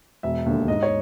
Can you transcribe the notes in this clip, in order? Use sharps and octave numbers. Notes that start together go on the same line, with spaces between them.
E1 E5
D#2 D3
G#2 D#5
C#5